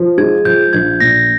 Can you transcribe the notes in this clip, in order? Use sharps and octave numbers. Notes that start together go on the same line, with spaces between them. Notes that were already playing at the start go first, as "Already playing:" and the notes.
Already playing: F3
G#3 G#6
F3 G6
A#1 G#6
A#2 A#6